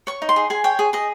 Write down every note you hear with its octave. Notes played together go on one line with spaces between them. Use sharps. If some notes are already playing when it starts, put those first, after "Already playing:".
C#5 C#6
D#4
C6
G#4
G#4 G#5
C#5 G5
G#4
G#4 D#5